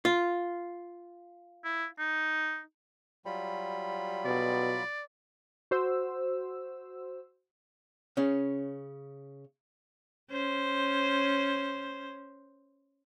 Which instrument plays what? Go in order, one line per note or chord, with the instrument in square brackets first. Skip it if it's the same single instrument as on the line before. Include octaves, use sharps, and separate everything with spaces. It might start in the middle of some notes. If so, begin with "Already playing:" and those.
[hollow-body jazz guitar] F4
[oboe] E4
D#4
[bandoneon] F#3 F4 B5 [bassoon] G3
[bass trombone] B2 [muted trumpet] D5
[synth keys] F#4 C5 E6
[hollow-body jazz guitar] C#3 C#4
[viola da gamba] C#4 C5